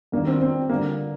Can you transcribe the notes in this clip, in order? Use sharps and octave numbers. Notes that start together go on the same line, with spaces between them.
G2 D#3 A#3
C4
C4
G2 D3 A#3